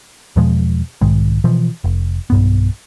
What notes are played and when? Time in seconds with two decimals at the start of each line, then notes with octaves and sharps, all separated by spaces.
0.36 E2 B2 F3 G#3
1.01 B1 G#2 D#3 G#3
1.44 B2 E3 F3
1.84 F1
2.30 B1 G2 B3